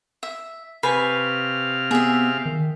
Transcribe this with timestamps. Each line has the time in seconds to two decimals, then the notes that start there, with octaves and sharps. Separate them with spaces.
0.23 E5
0.83 C3 B4 F5 G#5 C#6
1.91 B3 G#4 E5
2.46 D#3